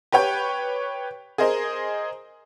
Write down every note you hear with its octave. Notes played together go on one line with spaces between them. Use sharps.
G4 B4 C#5 G5
G#4 A#4 C5 D#5